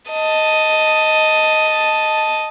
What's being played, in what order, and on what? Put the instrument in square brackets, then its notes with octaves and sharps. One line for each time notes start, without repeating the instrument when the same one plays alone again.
[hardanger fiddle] D#5 A5